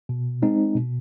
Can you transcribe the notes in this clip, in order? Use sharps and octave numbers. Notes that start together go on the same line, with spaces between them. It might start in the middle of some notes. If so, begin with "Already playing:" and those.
B2
G#3 C4 D#4
B2